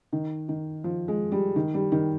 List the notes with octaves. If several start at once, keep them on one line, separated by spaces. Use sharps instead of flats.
D#3
D#3
F3
G#3
G3
D#3
G3
D#3